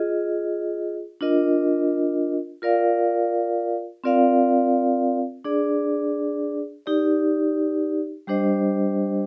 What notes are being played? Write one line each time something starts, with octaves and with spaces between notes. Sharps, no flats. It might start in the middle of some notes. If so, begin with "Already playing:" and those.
Already playing: F4 G#4 D#5
D4 F4 A#4 D#5
F4 A#4 D5 F5
C4 F4 A#4 D5 F5
D4 G#4 D5
D#4 G4 D5
G3 D4 G4 C5 D#5